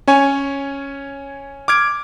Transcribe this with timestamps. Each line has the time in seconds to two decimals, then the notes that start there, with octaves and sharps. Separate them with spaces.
0.08 C#4 C#5 G#5
1.68 D6 F6 G#6 D7